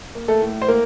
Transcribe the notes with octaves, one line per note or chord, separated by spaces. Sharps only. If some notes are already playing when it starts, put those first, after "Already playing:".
A#3
A3 A4
A2
C5
A#3 A#4